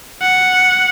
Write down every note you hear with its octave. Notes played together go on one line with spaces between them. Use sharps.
F#5